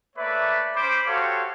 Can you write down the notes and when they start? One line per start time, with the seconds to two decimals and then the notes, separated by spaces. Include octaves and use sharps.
0.16 A3 A#3 B4 C#5 D5 E5
0.75 C#4 C5 B5 D6
1.07 F#4 G4 A4 C5 C#5 F5